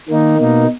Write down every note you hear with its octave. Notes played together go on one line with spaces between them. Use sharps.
D#3 A#3 D#4
B2 A#3 D#4